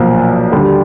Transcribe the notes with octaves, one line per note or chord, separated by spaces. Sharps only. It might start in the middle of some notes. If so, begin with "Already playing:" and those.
Already playing: B1 A#2 F3 A#3
D#2 D3 G3